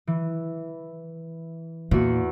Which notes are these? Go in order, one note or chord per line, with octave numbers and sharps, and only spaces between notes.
E3
E2 A#2 F#4